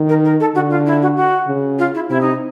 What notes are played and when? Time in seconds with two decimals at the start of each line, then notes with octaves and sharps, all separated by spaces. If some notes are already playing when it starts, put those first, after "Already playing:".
Already playing: D#3
0.09 A#4
0.24 A#4
0.40 A4
0.55 D3 F#4
0.70 F4
0.86 E4
1.02 F#4
1.16 F#4
1.48 C#3
1.78 F4
1.94 E4
2.09 C3 E4
2.20 D#4